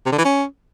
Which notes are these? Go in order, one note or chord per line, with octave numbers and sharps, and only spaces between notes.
C3
D3
E3
C#4